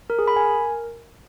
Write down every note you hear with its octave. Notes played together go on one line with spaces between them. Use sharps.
A#4
G#4
B5
G#5
A#4